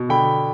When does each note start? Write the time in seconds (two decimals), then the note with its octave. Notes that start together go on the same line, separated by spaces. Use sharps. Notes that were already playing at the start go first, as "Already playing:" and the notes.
Already playing: B2
0.09 D3 G5 B5